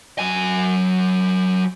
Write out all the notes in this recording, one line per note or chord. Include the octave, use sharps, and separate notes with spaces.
F#3 G#5